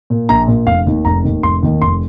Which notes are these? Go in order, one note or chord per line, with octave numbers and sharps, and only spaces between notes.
A#2
A#1 A#5
A#2
F1 F5
D#2 D#3
F1 A#5
D#2 D#3
F1 C6
D#2 D#3
F1 C6